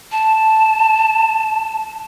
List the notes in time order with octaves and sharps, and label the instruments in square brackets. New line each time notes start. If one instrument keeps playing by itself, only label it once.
[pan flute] A5